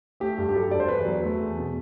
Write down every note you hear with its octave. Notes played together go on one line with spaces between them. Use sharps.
A3 G4
G2
G4
F#3 A4
G2 D5
C5
E2 B4
F#3
A3
E2
B2